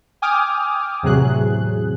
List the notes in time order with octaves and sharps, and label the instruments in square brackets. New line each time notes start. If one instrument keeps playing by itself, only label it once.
[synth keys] G5 G#5 D6 D#6 F6
E2 A2 C3 F#3 G#4 F#6